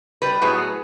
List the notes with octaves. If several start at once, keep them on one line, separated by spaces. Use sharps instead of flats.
G3 B4
A2 F#3 B3 G#4